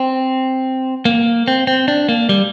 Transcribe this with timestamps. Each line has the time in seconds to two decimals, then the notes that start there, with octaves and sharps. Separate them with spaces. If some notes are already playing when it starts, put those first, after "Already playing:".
Already playing: C4
1.05 A#3
1.48 C4
1.67 C4
1.88 D4
2.09 A#3
2.29 G3